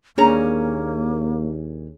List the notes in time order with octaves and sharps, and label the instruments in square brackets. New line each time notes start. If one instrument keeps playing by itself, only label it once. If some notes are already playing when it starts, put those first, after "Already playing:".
[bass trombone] D#2 [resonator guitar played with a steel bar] A#2 C#4 A#5 [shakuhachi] A#3 [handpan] D4 G#4 C#5